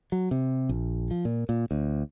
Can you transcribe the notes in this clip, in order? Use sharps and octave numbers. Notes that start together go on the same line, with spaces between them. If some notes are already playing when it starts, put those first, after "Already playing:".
F#3
C3
A#1
F3
A#2
A#2
D2